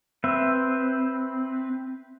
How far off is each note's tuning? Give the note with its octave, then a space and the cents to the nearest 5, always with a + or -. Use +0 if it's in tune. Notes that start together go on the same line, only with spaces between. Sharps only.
C4 +0 B4 +0 E5 +0